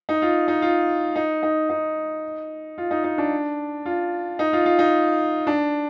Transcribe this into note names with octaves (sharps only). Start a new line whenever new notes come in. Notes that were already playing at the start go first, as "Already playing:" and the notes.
D#4
F4
D#4
F4
D#4
D#4
D#4
F4
D#4
D#4
D4
F4
D#4
F4
F4
D#4
D4